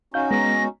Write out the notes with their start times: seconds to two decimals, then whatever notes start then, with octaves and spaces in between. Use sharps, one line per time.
0.14 C#4 D#4 F#4 F5 G6
0.31 G#3 B3 A#6